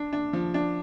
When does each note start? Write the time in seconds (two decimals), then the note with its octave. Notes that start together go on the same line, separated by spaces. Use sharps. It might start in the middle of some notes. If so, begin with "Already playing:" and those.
Already playing: D4
0.13 D4
0.33 F3
0.54 D4